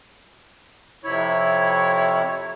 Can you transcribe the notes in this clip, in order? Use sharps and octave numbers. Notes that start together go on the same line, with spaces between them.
F2 C3 E4 C#5